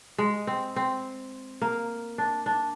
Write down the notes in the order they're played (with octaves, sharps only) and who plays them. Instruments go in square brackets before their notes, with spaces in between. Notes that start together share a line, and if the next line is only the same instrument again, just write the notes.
[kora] G#3
C4
C4
A#3
D4
D4